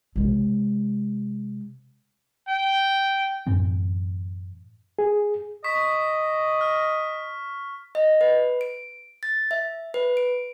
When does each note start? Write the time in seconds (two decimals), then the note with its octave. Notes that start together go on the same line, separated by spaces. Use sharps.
0.16 C3 G#3
2.48 G5
3.47 F#2 A2 E3 C4
4.99 G#4
5.64 D#5 C#6 B6
6.61 F6
7.95 D#5
8.21 B4
8.61 D7
9.23 A6
9.51 E5
9.94 B4
10.17 D7